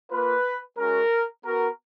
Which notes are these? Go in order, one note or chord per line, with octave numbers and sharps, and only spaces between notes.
A#3 F4 B4
G#3 C#4 F#4 A#4
B3 F#4 A#4